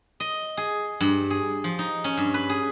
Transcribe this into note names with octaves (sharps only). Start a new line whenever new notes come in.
D#5
G#4
G2
G#4
F3
D#4
C#4
G2
B4
G#4